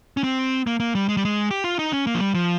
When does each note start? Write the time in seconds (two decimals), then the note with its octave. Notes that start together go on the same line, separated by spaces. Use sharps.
0.17 C#4
0.24 C4
0.67 A#3
0.80 A#3
0.95 G3
1.09 G#3
1.17 G3
1.25 G#3
1.51 G4
1.64 F4
1.79 D#4
1.93 C#4
2.07 A#3
2.14 F3
2.20 G3
2.34 F3